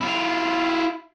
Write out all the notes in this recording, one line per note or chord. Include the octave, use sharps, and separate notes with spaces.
E4 F4